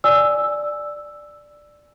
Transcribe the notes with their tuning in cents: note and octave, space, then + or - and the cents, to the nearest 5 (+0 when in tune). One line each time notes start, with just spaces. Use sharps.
D5 +5 G#5 +0 E6 +0